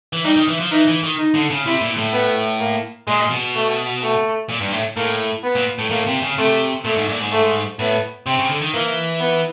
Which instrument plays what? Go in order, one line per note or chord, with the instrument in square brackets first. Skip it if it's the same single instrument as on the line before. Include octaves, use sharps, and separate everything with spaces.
[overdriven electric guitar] E3
[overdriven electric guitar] G3 [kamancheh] D#4
[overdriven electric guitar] D#3
E3
F3
[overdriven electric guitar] E3 [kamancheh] D#4
[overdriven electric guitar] E3
D#3
[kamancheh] D#4
[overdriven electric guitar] D3
C#3
[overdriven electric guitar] C3 [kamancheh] E4
[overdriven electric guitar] A#2
A2
[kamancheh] B3
A#3
[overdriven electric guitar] A#2 [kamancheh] G#3
[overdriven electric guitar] B2
[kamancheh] A3
A3
[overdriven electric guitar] A#2
G2
A2
[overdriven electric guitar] A2 [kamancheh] A#3
[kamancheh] B3
[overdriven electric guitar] A#2
A2
[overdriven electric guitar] A2 [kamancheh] A#3
[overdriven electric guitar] C3
C#3
[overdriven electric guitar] C3 [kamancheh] A3
[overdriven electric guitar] A#2 [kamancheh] A3
[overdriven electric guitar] G#2
A#2
G#2
[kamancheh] A3
[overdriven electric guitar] A2 [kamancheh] B3
[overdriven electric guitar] C3 [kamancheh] C4
[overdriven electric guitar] C#3
D3
D#3
[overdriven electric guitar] E3 [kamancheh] A#3
[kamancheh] B3